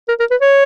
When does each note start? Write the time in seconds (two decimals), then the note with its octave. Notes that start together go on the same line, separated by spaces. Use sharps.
0.09 A#4
0.20 A#4
0.31 B4
0.41 C#5